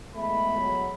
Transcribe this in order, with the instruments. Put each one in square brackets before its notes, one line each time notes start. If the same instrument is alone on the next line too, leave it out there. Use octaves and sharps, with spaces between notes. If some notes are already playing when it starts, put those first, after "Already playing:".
[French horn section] E3 G#3 B3 [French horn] A3 [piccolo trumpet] B5
[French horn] F#3